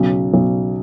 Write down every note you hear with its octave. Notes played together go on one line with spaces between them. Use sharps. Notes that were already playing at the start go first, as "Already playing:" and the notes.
Already playing: B1 C#3
B1